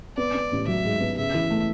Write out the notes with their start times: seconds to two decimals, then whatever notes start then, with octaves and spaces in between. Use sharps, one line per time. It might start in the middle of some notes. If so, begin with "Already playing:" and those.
0.17 B3 D5
0.34 B3
0.52 A1
0.67 F#3 E5
0.85 G#2
1.00 B3
1.17 C#3 E5
1.34 E3
1.50 A3